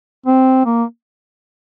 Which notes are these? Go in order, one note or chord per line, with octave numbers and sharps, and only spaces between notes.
C4
A#3